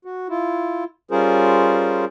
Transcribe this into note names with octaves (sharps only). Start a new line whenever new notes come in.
F#4
E4 F4
G3 C#4 F4 G#4 A#4 C5